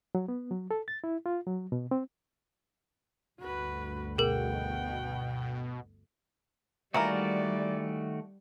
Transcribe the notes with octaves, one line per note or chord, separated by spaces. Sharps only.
F#3
B3
F#3
A4
A6
E4
F4
F#3
B2
C4
G1 D2 F#4 B4
B2 G#4 A#4 F#5 G5
D#3 E3 G3 A3 A#3 F#4 A#4 D5